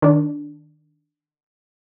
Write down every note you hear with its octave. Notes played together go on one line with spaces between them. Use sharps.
D#3 D4